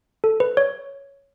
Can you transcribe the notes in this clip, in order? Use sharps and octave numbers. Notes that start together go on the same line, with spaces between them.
A4
B4
C#5